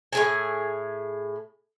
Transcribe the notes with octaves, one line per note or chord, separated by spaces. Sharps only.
A2 G#4 G#5